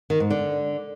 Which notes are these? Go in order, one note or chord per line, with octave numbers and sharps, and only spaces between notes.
D#3
G#2
D3